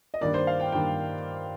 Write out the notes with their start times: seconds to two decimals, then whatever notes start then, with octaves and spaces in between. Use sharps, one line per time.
0.14 D#5
0.21 G2 D#3 A#3 D5
0.34 C5
0.47 F5
0.60 G5
0.72 G2 D#3 A#3 G5